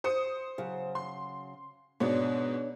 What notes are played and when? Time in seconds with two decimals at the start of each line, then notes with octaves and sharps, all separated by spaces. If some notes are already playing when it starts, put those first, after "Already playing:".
0.04 C5 D#6 C#7
0.58 C#3 F#3
0.95 C6
2.00 G#2 B2 D4 C#5